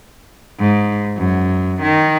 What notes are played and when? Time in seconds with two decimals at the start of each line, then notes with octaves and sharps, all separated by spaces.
0.59 G#2
1.17 F#2
1.82 D#3